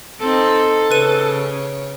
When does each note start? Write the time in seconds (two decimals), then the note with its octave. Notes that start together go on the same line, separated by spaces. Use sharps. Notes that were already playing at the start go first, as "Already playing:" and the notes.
0.21 C4 D#4 A4
0.91 C#3 B4 C#5 D#7